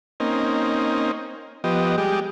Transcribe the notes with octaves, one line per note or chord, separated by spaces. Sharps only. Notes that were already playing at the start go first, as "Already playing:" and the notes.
A#3 C4 C#4 D#4
F3 B3 G4 D#5
G3 G#3 G4